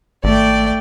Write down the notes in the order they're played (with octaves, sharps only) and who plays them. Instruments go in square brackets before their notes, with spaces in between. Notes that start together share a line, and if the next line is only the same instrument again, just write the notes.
[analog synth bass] G#1 [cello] A3 [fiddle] D5 G5